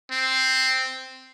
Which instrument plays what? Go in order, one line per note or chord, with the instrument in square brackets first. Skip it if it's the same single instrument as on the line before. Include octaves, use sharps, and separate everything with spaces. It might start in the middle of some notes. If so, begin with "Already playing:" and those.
[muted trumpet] C4